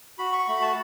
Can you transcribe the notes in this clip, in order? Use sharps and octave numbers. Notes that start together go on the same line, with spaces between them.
F#4 B5
C#6
A3 B5
A5